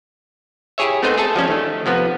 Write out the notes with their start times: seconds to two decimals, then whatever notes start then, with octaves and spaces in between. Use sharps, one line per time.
0.78 E4 G4 G#4 C#5 E5
1.02 A3 B3 C4 D#4 G#4 C5
1.18 G#4 A4 E5 A5
1.36 F3 G3 C#4
1.48 D#3 A3
1.86 C3 F3 B3